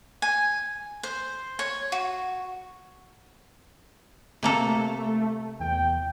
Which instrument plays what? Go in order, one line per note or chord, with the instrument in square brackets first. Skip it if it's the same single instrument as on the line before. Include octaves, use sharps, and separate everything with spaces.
[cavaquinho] G#5
C5
C#5
F#4
[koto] C3 A#3 A4 [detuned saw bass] A3
[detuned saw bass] E2 [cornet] G5